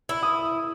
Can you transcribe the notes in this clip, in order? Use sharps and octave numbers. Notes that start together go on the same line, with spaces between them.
E4 E6
D#6